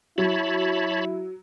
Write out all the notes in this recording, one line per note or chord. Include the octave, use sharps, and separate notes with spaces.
F#3 E4 C#5 A5 B5